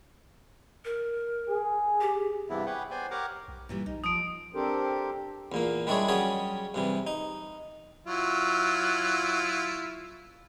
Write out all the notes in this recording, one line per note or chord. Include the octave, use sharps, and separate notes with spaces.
A#4
G#4
G4
G2 C3 E3 B3 E4
G4 G#4 B4 C#5 F#5 G5
B3 C5 D5 G5 G#5
G4 A#4 C#5 F#5 A#5 D6
B1
A#2 E3 G3
B1 D#4
F3 D#6 D7
C4 D4 G4 A4 A#4 C5
E2 A#2 A#3
G3 G#3 D4 E4 G#4 C#5
F#3 G3 C#4 G#4 C#5 D#6
G2 C3 E3
D#4
F#3 E4 F4